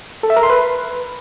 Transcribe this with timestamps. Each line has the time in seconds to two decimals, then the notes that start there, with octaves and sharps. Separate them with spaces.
0.23 A4
0.30 E5
0.36 A#4
0.43 C6
0.50 B4